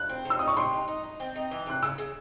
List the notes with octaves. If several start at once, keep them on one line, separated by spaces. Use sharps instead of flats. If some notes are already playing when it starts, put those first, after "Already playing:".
Already playing: F#6
C4
C3
E6
D#4 D#6
C#6
C3 C6
D#4
D#4
D#4
C4
D#4
E3
C3 F#6
C#3 E6
C#3